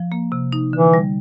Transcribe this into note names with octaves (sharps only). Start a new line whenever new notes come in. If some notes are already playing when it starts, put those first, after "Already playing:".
Already playing: F3
A#3
C3
D#4
D3 E3
G3